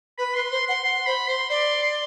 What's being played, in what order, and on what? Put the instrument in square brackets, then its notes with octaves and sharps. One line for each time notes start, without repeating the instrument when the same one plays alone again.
[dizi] B4 [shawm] B5
[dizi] B4 [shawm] C6
[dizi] C5 [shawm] C6
[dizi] F#5 [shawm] C6
[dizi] F#5 [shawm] C6
[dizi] C5 [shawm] B5
[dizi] C5 [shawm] C6
[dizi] D5 [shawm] C6
[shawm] C6